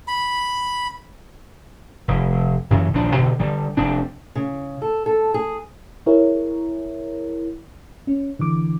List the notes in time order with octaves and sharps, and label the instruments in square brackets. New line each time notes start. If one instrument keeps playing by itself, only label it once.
[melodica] B5
[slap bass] F1
F#2 C#3 E3 F#3
A#1 D#2 F3 D4
B2 D3
D3 G3
F1 C4 D4
[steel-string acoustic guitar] C#3
A4
A4
G#4
[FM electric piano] E4 G#4 A#4 C#5
C#4
D3 E3 D6